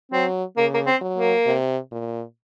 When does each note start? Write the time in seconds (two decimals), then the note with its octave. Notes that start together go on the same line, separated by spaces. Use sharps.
0.12 F#3 C4
0.57 C#3 A#3
0.74 A#3
0.87 C4
1.01 F#3
1.17 A#3
1.46 C3
1.92 A#2